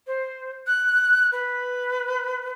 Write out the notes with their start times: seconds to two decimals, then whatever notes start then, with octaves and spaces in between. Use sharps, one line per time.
0.07 C5
0.67 F#6
1.32 B4